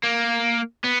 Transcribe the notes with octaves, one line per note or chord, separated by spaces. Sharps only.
A#3
B3